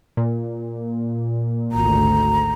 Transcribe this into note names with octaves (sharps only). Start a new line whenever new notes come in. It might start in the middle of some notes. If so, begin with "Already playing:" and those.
A#2
G#1 D2 A#5